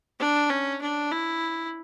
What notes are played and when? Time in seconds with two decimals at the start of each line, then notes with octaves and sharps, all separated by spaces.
0.20 D4
0.50 C#4
0.82 D4
1.12 E4